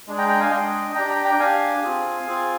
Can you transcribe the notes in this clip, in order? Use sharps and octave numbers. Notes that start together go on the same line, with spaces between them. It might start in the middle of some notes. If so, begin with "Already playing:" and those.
G#3 D4 G#4
G5 A#5
G5 A#5
F5 G#5
G#3 D4 G#4 D#5 G5
D4 G4 G5 A#5
G5 A#5
G5 A#5
D4 G4 F5 G#5
C4 F4 G#4
C4 F4 G#4